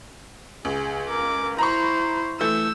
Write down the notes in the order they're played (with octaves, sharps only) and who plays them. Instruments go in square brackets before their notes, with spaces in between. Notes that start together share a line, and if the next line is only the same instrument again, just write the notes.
[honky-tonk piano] C#2 [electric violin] G#4
[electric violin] A#4 D6
[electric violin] E4 C5 [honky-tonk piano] A#5 B5 C#6
[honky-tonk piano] E3 A3 G6 [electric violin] E6